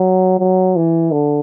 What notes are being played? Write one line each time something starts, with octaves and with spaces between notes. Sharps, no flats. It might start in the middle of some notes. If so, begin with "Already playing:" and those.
Already playing: F#3
F#3
E3
D3